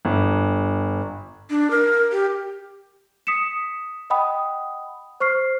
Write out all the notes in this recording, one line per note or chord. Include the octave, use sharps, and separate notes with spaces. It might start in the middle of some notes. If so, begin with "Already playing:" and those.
G1
D4
A#4
G4
D#6 B6 C#7 E7
D#5 F#5 G5 B5 D#6
C5 C#6 F6 C7